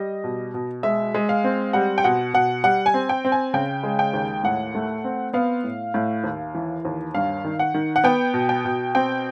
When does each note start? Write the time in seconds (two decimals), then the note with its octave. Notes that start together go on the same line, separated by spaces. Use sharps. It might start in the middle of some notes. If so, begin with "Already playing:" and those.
Already playing: G3 D#5
0.24 B2
0.54 B2
0.83 G#3 E5
1.14 G#3
1.29 F5
1.44 C4
1.73 G3 F#5
1.98 G5
2.04 B2 F#5
2.34 B2 F#5
2.64 G3 F#5
2.86 G#5
2.94 C4
3.09 G5
3.25 C4
3.32 G#5
3.54 C#3 G5
3.83 G#3
3.99 G5
4.13 D#2
4.43 A2 F#5
4.75 A3
5.04 C4
5.33 B3 F5
5.64 A2
5.94 A2
6.24 D#2
6.54 E3
6.85 D#2
7.14 G2 F5
7.44 D#3
7.59 F#5
7.74 D#3
7.96 F#5
8.04 B3 G5
8.34 B2
8.49 G5
8.65 B2
8.95 C4 G5